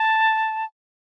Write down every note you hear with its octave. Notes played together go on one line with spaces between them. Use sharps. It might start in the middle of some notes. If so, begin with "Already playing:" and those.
Already playing: A5